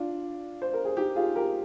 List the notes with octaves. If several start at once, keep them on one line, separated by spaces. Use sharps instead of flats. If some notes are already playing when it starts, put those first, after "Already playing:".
Already playing: D4 F4
C5
A#4
G#4
D#4 G4
F4 G#4
G4 A#4